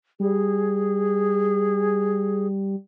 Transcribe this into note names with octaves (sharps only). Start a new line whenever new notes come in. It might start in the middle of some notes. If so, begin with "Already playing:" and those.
G3 G#4